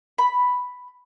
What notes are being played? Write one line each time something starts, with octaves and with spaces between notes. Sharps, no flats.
B5